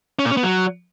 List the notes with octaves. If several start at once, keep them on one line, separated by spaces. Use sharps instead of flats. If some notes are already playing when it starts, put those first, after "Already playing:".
C#4
A#2
C#4
B3
F#3